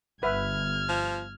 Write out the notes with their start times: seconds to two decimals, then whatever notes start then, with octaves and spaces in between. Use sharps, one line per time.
0.23 G1 B4 E5 F6 G#6
0.89 F3